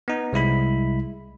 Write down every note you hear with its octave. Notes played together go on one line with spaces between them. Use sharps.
B3 D#4
C2 G#3 E4 B5